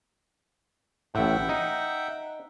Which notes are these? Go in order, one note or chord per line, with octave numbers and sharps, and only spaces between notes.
A1 A2 E5 F#5 G5
D#4